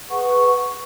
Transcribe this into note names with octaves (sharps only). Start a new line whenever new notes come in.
G#4 B4 F#5 C#6